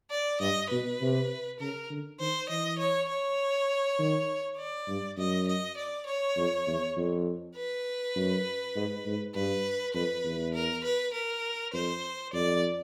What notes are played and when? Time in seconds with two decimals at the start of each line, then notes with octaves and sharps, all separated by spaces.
0.11 D5
0.40 G2 D#5
0.70 B2 B4
1.01 C3
1.60 C#3 A#4
1.90 D3
2.20 D#3 C5
2.49 E3 D#5
2.79 C#5
3.09 C#5
3.99 D#3
4.57 D5
4.88 G2
5.17 F#2 D#5
5.47 D#5
5.77 D5
6.07 C#5
6.36 F2
6.67 E2
6.96 F2
7.56 B4
8.15 F#2
8.75 G#2
9.06 G#2
9.34 G2 B4
9.94 F2 B4
10.24 E2
10.54 A#4
10.84 B4
11.14 A#4
11.73 F2 C5
12.33 F2 D5